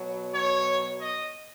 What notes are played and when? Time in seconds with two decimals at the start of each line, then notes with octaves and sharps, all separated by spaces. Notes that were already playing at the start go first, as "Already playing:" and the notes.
Already playing: B2 F#3
0.34 C#5
1.01 D#5